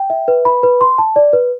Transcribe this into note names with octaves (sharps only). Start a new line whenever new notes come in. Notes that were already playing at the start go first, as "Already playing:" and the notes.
Already playing: G5
E5
B4
B5
B4
C6
A5
D5
B4